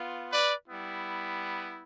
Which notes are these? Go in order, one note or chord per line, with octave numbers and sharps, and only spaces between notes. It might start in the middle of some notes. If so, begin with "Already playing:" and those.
Already playing: B3 F4
B4 D5
G3 B3 E4